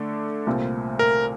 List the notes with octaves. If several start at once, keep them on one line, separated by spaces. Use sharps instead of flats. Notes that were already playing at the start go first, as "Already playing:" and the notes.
Already playing: D3 A3 D4 A4
C2 A#2 A3 C4
A#4